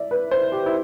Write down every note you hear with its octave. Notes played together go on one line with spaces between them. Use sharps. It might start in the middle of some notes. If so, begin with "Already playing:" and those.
Already playing: D5 E5
B4
C5
G4
E4